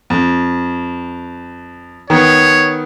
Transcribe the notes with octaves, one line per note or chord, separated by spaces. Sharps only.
F2
D#3 B3 C#5